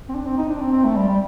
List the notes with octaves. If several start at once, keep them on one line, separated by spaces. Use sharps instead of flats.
C4
D4
C4
D#4
D4
C4
C4
A3
G3
G3